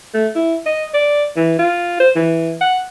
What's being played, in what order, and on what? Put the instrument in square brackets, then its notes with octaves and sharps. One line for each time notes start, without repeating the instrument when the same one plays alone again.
[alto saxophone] A3
E4
D#5
D5
E3
F4
C5
E3
F#5